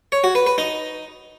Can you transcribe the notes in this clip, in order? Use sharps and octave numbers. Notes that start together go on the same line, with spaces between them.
C#5
F#4
B4
B4
D#4